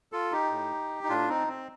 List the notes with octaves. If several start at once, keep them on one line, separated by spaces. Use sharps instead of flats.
F4 A4
D#4 G4
A2
D#4
A2 D4 F4
C4 D#4
C4